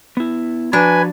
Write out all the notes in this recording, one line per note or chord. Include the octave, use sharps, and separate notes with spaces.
B3 E4
F3 D4 F#4 B4 G#5 A#5